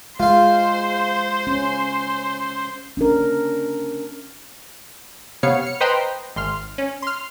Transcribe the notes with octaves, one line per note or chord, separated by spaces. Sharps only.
G#3 F4 C5 F5
C#4
C#4 D4 A#4
C3 B3 C#5 F5 C#7
F6 C#7
B4 C5 D#5 G5 A#5 C6
G#1 C6 F6
C#4
C6 F6